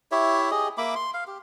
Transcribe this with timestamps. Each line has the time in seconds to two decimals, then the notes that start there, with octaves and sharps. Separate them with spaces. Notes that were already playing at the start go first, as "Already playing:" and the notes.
0.12 E4 G4 C#5 E5
0.51 G4 G#4 D#5
0.78 A#3 E5 B5 D6
0.95 C6
1.14 F5
1.27 G4